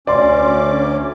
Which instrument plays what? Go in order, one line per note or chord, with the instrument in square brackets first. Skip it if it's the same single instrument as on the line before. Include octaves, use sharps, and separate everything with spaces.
[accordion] D2 C#4 D6 [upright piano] D5 C6